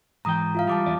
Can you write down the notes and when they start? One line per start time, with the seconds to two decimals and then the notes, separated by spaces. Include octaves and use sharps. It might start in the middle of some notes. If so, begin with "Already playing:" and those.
0.25 G#2 E3 G5 A#5 D#6
0.55 F4 E5 F5
0.67 G3 A5 D6 D#6
0.86 E2 D5 E5